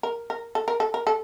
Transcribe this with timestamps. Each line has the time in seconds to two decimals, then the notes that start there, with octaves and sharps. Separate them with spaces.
0.03 A#4
0.30 A#4
0.55 A4
0.68 A#4
0.80 A4
0.94 A#4
1.07 A4